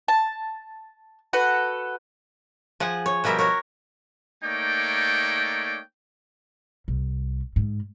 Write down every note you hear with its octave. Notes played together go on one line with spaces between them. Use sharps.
A5
F#4 A4 B4 F#5
F3 G#4 F#5
C#5
B2 F3 G3 A#4 E5
F#4 A#4 C#5
A3 A#3 D#4 C#5 D5 G5
C2
G#2